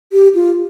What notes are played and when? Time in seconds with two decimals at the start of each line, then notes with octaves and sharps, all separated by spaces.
0.12 G4
0.35 F4